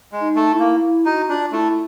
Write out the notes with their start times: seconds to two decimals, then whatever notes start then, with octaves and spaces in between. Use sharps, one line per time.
0.12 G#3
0.20 D#4
0.36 A3
0.52 E4
0.60 A#3
0.82 E4
1.05 D#4 F#4
1.29 D4 F4
1.52 A3 E4